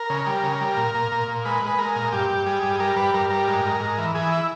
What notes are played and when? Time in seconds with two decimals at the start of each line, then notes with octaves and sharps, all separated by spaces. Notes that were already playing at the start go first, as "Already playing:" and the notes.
Already playing: A#4
0.10 C#3
0.27 G3
0.43 C#3
0.61 G3
0.77 A#2
0.95 A#2
1.12 A#2
1.28 A#2
1.45 G#3 B4
1.62 G#3 B4
1.78 G#3 A#4
1.96 A#2
2.12 G2 G4
2.29 G2
2.46 G3 G#4
2.63 G2
2.73 G#4
2.80 G3 A#4
2.96 G2 B4
3.14 G2 A#4
3.30 G3 A#4
3.47 G#2
3.65 G#2
3.81 G#2
3.98 E3
4.15 E3 G#4
4.32 E4